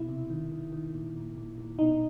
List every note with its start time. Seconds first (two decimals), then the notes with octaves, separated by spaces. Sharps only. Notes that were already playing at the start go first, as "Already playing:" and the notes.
Already playing: B2 E4
0.09 C3
0.30 D#3
0.52 D#3
0.73 D#3
0.94 A#2
1.16 A#2
1.37 A#2
1.58 A#2
1.79 B2 D#4